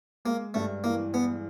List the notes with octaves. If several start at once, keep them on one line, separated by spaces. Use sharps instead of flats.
G#3 A#3
G2 A3
E3 A#3
E2 B3